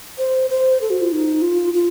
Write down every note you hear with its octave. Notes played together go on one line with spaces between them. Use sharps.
C5
C5
A4
F#4
F4
D#4
F4
F4